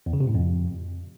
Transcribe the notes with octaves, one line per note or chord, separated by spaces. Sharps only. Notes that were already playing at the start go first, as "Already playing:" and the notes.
E2
C#3
C3
A2
F2